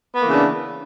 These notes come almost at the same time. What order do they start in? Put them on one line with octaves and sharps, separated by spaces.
B3 A#3 E3 C#3 D4